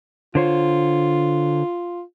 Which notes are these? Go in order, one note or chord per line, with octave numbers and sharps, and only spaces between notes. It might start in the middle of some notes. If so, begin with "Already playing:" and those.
D3 F4 C5 C#5